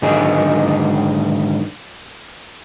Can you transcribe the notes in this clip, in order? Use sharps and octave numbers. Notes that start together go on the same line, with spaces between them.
G#2 D3 D#3 F#3 D#4 G#4